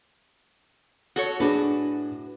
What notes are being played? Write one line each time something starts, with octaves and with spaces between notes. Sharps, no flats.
F#4 A4 C#5
A2 D4 F#4 G#4 B4